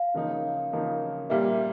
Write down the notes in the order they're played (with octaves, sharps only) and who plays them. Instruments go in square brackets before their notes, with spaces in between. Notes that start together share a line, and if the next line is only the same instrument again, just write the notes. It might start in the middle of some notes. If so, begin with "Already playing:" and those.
Already playing: [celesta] F5
[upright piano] C#3 F3 A#3 D#4
C#3 F3 A#3 D#4
[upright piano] A#2 G3 A#3 [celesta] E5